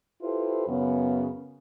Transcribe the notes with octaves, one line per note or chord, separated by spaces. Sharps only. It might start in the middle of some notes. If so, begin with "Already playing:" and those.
E4 F4 G4 A4 B4 C5
F#2 C#3 B3